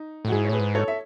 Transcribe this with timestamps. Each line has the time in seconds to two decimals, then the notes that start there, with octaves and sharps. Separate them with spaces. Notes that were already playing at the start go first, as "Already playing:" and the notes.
Already playing: D#4
0.25 A2
0.27 F#4
0.32 G#2 E4 G#4
0.45 C#5
0.49 A2 G#4 B4
0.60 G#2
0.75 A4 C#5
0.88 E5